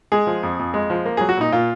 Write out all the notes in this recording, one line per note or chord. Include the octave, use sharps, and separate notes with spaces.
G#3 G#4
F3
F2
F2
G#3
F3
A#3
G#4
F#3
F#4
A#2 D#4
A#2 F4